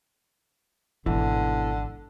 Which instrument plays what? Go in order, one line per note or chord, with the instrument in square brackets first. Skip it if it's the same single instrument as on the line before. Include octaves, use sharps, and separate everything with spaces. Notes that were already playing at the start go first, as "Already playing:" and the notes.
[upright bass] G#1 [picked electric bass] B2 E3 [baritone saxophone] D3